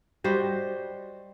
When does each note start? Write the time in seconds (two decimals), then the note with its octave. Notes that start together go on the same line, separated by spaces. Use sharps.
0.24 G3 F#4 C5 D#5